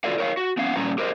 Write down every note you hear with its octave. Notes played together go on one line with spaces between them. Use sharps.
F4 F#4 A4 B4 D5 F5
A#4 C#5 F5
F#4
B3 C#4 F5 F#5
A#2 G3 C#4 B4 A#5
G4 A#4 C5 D#5